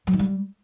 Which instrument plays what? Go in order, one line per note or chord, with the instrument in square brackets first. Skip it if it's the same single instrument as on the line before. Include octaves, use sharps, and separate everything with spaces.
[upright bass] F#3
D#3
G3